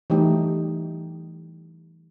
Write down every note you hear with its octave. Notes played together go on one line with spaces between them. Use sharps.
E3 G3 A3 D#4 G4